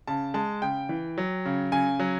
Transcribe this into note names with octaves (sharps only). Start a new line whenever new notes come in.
C#3 A5
G#3 A5
C#3 G5
E3
F#3
C#3
C#3 G#5
F#3